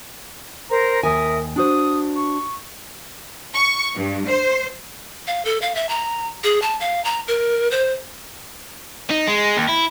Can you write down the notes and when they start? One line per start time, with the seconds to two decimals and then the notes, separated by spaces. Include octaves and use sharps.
0.70 A#4 C5 A#5
1.03 D#2 A#4 E5 G#5 D#6
1.56 D4 F#4 C5 D#6
2.16 C#6
3.54 C#6
3.96 G2
4.29 C5
5.27 F5
5.45 A4
5.62 F5
5.75 E5
5.89 A#5
6.44 G#4
6.62 A5
6.81 F5
7.05 A#5
7.28 A#4
7.71 C5
9.10 D#4
9.27 G#3
9.57 D#2
9.68 E4